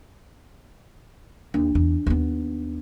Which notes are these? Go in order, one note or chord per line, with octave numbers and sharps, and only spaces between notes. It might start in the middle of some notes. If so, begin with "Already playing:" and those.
D#2 D4
E2
D#2 B3